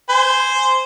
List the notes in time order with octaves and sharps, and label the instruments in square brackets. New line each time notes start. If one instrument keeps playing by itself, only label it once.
[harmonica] C5 G#5